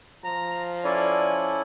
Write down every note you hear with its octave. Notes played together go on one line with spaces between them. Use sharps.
F3 A#5
C#4 E4 A4 D5 G#5